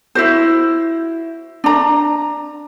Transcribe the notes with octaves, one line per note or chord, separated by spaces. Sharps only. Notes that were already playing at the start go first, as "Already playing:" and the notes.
E4 F#4 C5
D4 A#5